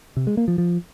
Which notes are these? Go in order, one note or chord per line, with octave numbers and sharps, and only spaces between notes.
C3
G#3
A#3
F3
F3